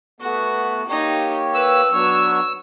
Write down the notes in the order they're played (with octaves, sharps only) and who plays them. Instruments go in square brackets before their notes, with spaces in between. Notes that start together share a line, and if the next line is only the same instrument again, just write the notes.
[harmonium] A3 B3 [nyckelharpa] F#4
[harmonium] A#3 G4 C#5 [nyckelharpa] D#4
[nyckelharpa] B4 [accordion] E6
[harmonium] F#3 B3 D4 [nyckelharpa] C#5